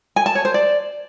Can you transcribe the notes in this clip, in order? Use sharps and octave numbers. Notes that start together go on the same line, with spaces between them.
G#5
A5
C#5
C5
D5